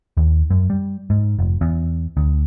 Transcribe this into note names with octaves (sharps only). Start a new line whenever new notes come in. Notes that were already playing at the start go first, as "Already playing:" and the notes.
D#2
F#2
G3
G#2
F1
E2
D2